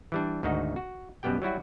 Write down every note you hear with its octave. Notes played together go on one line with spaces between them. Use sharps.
E3 G3 D4
D2 G#2 D#3 D#4 F#4
F#4
F#2 B2 G3 B3 G4 G5
F#3 G3 E4 F#4